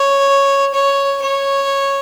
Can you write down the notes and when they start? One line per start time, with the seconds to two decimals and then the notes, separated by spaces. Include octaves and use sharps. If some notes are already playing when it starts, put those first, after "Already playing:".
Already playing: C#5
0.74 C#5
1.22 C#5